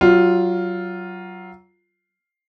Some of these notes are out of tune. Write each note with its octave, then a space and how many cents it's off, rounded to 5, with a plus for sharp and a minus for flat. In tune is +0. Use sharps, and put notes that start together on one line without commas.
F#3 +20 F4 +0